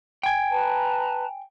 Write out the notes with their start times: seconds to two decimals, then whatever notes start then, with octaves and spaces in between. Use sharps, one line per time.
0.23 G5 G#5
0.51 B4 A5 A#5